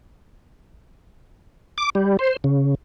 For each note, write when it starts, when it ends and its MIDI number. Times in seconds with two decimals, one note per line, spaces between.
1.78 1.90 86
1.95 2.17 55
2.19 2.36 72
2.44 2.75 49